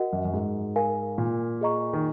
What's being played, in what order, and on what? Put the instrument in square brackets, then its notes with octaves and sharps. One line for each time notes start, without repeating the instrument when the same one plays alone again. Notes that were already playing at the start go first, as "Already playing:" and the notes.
Already playing: [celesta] F#4 A#4 D#5 F#5
[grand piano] F#2
F#2
G#2
[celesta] A#4 F5 G#5
[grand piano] A#2
[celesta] G#4 D#5 A#5 C#6
[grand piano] D#3